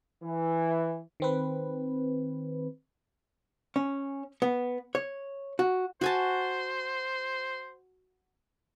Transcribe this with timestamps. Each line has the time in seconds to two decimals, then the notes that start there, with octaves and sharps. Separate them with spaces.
0.23 E3
1.20 D#3 C4 B4
3.76 C#4
4.42 B3
4.95 C#5
5.59 F#4
6.01 F#4 C5 G#5 A5